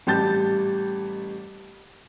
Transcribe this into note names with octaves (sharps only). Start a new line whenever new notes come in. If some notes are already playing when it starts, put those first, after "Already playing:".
A1 G3 G4 A5 G6 A6